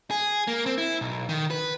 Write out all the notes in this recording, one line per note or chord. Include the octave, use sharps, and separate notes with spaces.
G#4
A#3
C4
E4
B1
D#3
B4